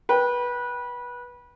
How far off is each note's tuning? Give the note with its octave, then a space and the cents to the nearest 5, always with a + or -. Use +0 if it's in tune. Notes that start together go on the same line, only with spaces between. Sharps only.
B4 -20 G5 +0